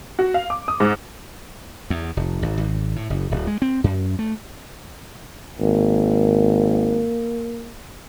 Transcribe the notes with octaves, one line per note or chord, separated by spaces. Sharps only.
F#4
F5
D6
D#6
G#2
E2
F1
G#1
G#1
A2
F#1
D1
G#3
C4
F#2
A3
G#1 A#3